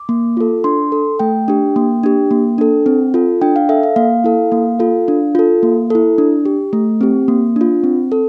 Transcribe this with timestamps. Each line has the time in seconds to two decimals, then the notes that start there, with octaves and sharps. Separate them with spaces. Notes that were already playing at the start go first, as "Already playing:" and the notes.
Already playing: D6
0.09 A#3
0.37 F4 A4
0.64 D4 C6
0.92 A4
1.19 A3 G5
1.48 D4 G4
1.76 A#3
2.03 D4 G4
2.31 A#3
2.58 D4 A4
2.86 C4
3.14 F4 A4
3.41 D4 G5
3.56 F5
3.69 A4 E5
3.83 F5
3.96 A#3 F5
4.24 E4 A4
4.52 A#3
4.79 F4 A4
5.08 D4
5.35 F4 A4
5.63 A#3
5.90 E4 A4
6.18 D4
6.45 G4
6.73 A3
7.01 C4 G4
7.28 A#3
7.56 D4 F4
7.84 C4
8.12 A4